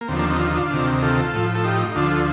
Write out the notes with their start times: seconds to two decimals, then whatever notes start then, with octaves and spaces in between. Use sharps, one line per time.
0.01 A#3
0.08 D#2 D3 F3 C4
0.18 A#3 D4
0.30 C4 D#4
0.39 F4
0.47 D#4
0.56 D4 F4
0.70 D2 C3 D#3
1.02 F4 A4
1.34 A2 F3
1.55 A4
1.64 D#4 G4
1.92 D#4
1.95 D2 D3 F3 D4 F4
2.11 F4 A4